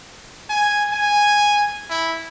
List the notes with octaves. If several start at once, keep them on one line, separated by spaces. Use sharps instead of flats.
G#5
G#5
E4